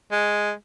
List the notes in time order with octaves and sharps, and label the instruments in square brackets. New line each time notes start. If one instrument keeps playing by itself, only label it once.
[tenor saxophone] G#3